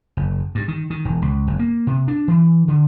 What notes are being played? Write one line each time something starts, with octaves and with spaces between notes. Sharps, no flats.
F#1
G2
D#3
D#3
E1
C#2
F#1
A#3
C3
D4
E3
D3